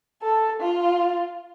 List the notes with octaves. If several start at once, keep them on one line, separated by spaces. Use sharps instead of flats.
A4
F4